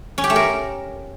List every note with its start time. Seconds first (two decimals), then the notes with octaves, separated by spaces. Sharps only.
0.18 C#4
0.24 G4
0.30 A3
0.36 A#4